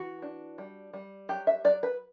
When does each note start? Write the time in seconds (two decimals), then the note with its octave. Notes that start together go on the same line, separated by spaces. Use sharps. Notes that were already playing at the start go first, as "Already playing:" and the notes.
Already playing: E3 F#4
0.22 D4
0.58 G3
0.93 G3
1.29 F#3 G4
1.47 E5
1.64 F#3 D5
1.83 B4